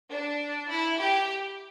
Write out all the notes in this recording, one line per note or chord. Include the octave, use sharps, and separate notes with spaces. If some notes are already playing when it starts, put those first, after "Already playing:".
D4
E4
G4